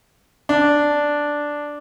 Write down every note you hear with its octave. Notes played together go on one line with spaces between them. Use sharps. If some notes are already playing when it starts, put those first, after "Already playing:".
D4